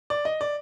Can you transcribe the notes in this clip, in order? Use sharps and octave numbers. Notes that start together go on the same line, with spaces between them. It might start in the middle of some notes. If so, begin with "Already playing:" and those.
D5
D#5
D5